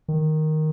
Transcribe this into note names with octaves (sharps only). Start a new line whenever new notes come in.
D#3